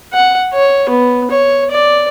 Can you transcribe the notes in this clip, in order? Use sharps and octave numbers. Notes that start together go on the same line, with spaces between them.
F#5
C#5
B3
C#5
D5